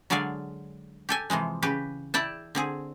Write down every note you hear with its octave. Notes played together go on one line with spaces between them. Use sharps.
D3 F#3 G#3 D5 F5 G#5
G4 A4 G#5
C3 E3 F3 G#3
C#3 G4 B4
E4 D5 G5 A5
D3 C4 G#4